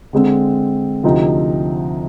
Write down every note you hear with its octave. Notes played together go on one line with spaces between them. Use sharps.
D3 G#3 C4
D2 C3 F3 C4 D#4